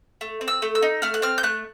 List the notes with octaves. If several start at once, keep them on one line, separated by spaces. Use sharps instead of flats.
A3
C4
E6
A3
E6
D#4
A3 F6
F#6
C4 F6
G6
A3 F#6